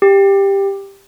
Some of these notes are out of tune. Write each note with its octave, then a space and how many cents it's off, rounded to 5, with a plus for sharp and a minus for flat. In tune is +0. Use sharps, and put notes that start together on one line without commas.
G4 +10